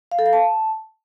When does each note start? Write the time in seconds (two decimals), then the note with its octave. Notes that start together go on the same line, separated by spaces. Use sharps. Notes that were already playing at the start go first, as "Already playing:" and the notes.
0.11 F5
0.19 A4
0.26 F5
0.33 A5